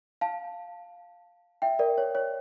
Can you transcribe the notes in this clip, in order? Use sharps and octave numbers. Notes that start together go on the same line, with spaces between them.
F5 A5
E5 G5
A#4 D5
C#5
C#5